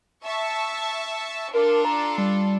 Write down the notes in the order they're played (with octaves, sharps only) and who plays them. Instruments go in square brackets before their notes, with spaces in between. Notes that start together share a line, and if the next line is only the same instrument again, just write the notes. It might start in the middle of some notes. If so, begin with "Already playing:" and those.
[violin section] E5 A5 C#6
[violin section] D4 F4 A4 [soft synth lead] A#4
[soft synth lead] A#5
G3